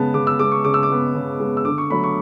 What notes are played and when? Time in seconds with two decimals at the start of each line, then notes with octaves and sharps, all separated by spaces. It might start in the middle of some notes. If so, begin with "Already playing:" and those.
Already playing: C#3 G#3 B3 A5
0.14 C#3 D6
0.27 E6
0.39 G#3 B3 D6
0.52 C#6
0.65 C#3 D6
0.74 E6
0.83 D6
0.90 G#3 B3
1.15 C#3
1.40 G#3 B3
1.57 E6
1.65 D3 D6
1.78 C#6
1.90 F#3 A3 B5
2.04 C#6